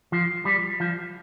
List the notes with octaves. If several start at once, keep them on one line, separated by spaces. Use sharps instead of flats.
F3
G3
F3